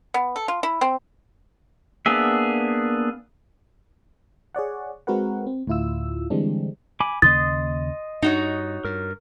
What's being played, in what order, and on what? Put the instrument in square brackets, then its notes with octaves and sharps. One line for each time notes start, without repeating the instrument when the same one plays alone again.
[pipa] B3
A4
F4
E4
C4
[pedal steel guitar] A#3 B3 D4 G#4 E5
[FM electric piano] G#4 C#5 D5 F#5
G#3 C4 F#4 A#4 B4 F#5
C4
D2 A2 E4 F4 E6
D3 E3 G3 G#3 C4 D4
[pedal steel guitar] G#5 B5 D6
[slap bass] D#2 C#3 A#3 [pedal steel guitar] D#5 C6 D#6 [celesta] A6
[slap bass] G2 [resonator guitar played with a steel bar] D#4 F#4 C#5
[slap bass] G2 [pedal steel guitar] A#4